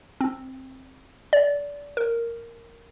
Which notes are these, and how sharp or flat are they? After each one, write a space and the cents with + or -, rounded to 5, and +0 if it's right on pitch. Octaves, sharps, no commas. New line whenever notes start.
C4 +10
D5 -25
A#4 -5